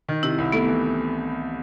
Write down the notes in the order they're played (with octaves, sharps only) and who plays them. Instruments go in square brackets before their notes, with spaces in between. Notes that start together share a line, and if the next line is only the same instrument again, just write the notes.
[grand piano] D#3
[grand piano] C3 [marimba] E4
[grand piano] C2
[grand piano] A3 [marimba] B3
[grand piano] E3